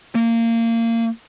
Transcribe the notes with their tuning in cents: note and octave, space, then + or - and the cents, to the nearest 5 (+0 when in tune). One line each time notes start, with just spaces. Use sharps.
A#3 -25